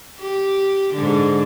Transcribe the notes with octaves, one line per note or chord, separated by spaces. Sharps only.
G4
G#2 D3